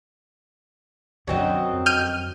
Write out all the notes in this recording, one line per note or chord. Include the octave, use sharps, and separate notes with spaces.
F#2 D3 F#3 C4 D#5
F2
F6 G6 D#7